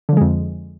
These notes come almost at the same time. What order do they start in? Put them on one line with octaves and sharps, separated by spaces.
D3 F3 G#3 F2